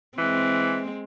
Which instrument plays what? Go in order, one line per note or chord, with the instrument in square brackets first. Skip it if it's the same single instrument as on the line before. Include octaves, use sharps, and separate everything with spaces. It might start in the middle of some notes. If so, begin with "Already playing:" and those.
[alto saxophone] E3 [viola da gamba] G#3 C4